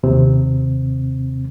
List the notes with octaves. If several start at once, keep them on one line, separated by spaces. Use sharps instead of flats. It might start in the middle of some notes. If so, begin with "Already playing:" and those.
D#2 C3 C4